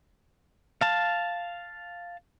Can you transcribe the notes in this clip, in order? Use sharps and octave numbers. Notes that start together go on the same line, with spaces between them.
F5 A5